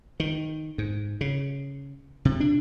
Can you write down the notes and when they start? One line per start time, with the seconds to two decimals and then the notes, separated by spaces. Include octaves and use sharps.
0.20 D#3
0.78 G#2
1.21 C#3
2.25 C3
2.40 D4